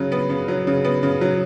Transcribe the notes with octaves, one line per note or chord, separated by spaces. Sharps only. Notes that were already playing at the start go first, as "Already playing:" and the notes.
Already playing: C#3 F#3
B3
C#3
F#3
C#3
B3
C#3
F#3